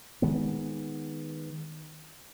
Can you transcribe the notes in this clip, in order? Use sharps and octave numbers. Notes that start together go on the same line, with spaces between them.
D#3 G#3 B3